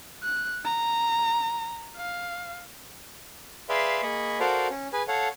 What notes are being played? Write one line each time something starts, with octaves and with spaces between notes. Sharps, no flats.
F#6
A#5
F5
G#4 B4 D5 E5 F5 C6
A#3 G#4 D#5 B5 C#6
F#4 A4 A#4 C5 D5 F5
C#4
G#4 B4 G#5
A4 C#5 F5 F#5